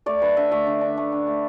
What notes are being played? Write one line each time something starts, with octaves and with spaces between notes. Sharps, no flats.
A3 D5
D3 B4
D3 E5
A3 E5
D3
D4
A3
D3
A3